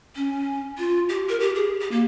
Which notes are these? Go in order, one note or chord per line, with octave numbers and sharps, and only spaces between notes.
C#4
F4
G4
A#4
G4
G#4
G4
A#3